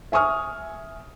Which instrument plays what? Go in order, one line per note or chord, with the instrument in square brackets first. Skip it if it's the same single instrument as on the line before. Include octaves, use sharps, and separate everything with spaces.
[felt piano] E5 G#5 C#6 D#6 F6